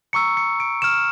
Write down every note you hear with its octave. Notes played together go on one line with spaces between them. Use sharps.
A#5 C#6 E6 C#7
C#7
D7
C#6 F6 E7